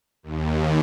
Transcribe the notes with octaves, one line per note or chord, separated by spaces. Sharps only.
D#2